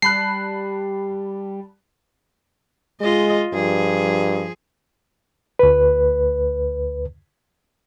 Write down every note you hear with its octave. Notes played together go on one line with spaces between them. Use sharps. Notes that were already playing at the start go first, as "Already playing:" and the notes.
G3 A5 B5 F#6 C7
G#3 F4 D#5
G2 F3 G#4
D2 B4